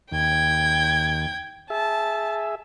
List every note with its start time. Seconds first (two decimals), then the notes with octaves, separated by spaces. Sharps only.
0.11 D#2 G5 G#6
1.70 G#4 E5 A5